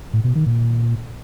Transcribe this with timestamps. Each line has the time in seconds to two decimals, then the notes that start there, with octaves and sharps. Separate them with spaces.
0.13 A2
0.24 B2
0.35 D#3
0.46 A#2